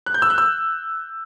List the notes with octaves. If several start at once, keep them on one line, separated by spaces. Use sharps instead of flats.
F#6
G6
E6
F#6
E6